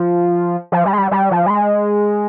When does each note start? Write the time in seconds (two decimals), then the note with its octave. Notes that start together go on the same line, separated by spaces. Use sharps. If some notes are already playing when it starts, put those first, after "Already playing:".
Already playing: F3
0.72 F3
0.86 G3
0.93 G#3
0.98 G3
1.11 G3
1.31 F3
1.46 G3
1.50 G#3